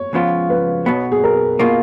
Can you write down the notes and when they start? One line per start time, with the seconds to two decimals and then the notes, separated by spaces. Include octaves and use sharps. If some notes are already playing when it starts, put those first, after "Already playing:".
Already playing: C#5
0.13 C#2 C#3 F3 B3 F4
0.50 B4
0.86 B1 B2 F#3 B3
1.12 G#4
1.24 A#4
1.59 B2 A#3 F4